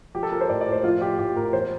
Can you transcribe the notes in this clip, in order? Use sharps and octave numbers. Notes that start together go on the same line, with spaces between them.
F3 G4
A4
F3 A#4
C5
A2 D5
D5
A2
C5
F3 F4
F3 G4
A2 G4
A2 A#4
E2 C5